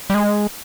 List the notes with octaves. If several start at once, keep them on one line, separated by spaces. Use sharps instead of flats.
G3
G#3